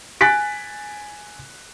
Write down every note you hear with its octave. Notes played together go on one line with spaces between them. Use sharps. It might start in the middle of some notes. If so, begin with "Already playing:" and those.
G#5 F#6 A6 B6 D7